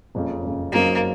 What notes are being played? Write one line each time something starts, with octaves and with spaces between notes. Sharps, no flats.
F#1 F2 C#3
F#1 F2 C#3
F#2 C#3 F#3 A#3 C4 D#4